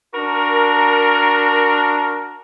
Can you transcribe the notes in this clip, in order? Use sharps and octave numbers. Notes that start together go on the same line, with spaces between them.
D4 F#4 A#4